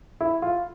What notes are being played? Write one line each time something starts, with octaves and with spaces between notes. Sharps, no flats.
E4
F4